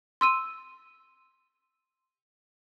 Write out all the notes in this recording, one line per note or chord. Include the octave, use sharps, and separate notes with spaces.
C6 E6 D#7